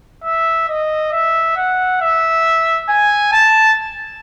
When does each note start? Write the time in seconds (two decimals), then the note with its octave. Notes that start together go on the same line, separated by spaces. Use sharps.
0.24 E5
0.68 D#5
1.12 E5
1.57 F#5
2.01 E5
2.89 G#5
3.33 A5